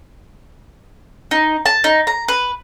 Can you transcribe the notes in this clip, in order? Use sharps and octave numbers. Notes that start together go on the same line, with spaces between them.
D#4
A5
D#4
A#5
B4